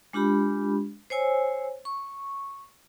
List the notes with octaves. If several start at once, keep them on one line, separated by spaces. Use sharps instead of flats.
G#3 D4 F4 G4 B5
C5 C#5 G#5 E6
C#6